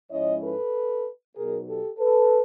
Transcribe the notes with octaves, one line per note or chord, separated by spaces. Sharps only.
G#2 F3 G#3 C#4 E4 C#5 D#5
A4 B4
B2 F#3 B3 D#4 G#4 A#4
G4 A4
A4 B4